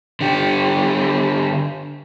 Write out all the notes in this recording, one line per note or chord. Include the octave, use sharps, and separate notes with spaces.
D3 G4